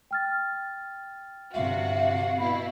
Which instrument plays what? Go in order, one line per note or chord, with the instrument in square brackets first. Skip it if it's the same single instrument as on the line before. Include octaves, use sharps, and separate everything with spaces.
[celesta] G5 F6 A6
[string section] G1 C3 F#4 [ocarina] E5 [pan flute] F5
[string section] B2 E4 [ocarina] B5